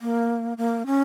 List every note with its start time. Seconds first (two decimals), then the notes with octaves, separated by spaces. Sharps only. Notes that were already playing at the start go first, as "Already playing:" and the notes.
0.01 A#3
0.58 A#3
0.86 C#4